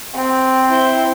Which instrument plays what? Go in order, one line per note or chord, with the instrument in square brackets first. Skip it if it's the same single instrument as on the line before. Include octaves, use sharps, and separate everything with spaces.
[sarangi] C4
[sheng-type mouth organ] E4 C5